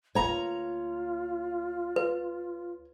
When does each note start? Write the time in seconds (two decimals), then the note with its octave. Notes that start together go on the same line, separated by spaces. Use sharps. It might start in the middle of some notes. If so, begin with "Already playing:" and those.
0.15 D2 A#3 F4 C#5 A#5
1.96 B4